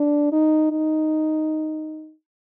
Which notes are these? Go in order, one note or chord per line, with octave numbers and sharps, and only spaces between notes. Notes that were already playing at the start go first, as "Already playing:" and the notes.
Already playing: D4
D#4
D#4